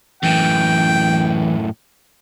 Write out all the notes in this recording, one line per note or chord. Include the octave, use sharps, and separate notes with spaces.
F#2 A2 E3 G5